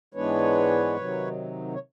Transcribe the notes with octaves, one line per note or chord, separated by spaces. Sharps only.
G#2 E3 G#3 B3 D4 B4 C#5
C3 D#3 F#3
C#5